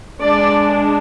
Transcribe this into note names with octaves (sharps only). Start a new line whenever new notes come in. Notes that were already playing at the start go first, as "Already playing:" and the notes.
G#3 D4 D5